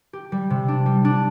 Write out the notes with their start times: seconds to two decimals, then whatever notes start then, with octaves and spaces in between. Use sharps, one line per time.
0.13 G4
0.32 G3
0.50 C3
0.68 D4
0.86 G3
1.05 D4